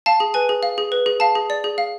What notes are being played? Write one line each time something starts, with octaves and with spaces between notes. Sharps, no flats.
F5 A5
G#4
B4 G#5
G#4
F5
G#4
B4
G#4
F5 A5
G#4
D5
G#4
F5